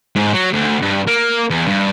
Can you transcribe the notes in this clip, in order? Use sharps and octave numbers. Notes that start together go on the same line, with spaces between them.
G#2
F#3
D2
G2
A#3
E2
G2